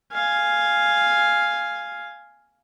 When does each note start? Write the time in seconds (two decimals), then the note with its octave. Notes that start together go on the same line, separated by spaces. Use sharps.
0.13 F5 G#5